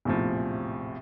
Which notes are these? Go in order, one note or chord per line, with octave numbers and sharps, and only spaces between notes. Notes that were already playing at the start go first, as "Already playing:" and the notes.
A#1 E2 A2 C3 F3